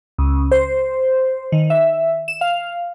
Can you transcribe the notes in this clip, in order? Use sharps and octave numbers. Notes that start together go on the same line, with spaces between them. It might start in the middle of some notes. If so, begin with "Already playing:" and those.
C#2
C5
D#3
E5
E7
F5